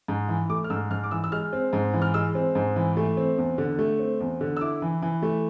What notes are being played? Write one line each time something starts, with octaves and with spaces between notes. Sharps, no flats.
G#2
E3
A3 D6
F6
G#2 E6
G#2 F6
D6
E3 E6
E6
G#3 F6
C4
G#2
E3
F6
G#3 E6
C4
G#2
E3
A3
C4
E2
D3
A3
C4
E2
D3
E6
E4 D6
E3
E3
A3